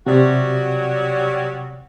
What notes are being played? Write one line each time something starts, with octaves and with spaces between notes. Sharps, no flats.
C3 F#3 G3 F#4